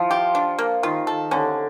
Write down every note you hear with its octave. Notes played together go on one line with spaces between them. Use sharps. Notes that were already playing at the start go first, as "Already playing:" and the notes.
Already playing: F3 E4
G4
D4
A#3
D#3 F4
A4
D3 C#4